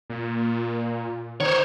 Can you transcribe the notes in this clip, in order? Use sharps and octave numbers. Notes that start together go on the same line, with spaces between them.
A#2
D#3 C5 C#5